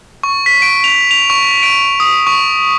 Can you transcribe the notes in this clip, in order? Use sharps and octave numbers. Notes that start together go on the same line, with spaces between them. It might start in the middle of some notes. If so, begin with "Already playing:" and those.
C#6
B6
D7
F7
F7
C#6
D7
D#6
C#6